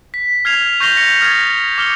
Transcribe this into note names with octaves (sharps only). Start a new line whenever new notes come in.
B6
F6 G#6 C7 F7
C#6 G6 A#6 C7 F7 G7
A#6 C#7
D#6 F6 G#6 A6
D6 F6 C#7 G7